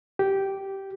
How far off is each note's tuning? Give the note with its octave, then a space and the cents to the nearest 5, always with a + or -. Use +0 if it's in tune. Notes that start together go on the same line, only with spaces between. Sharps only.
G4 -10